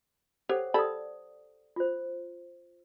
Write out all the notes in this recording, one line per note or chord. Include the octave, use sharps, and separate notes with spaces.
G4 A4 C5 C#5 F#5
G4 A4 D5 B5 D#6
F4 C5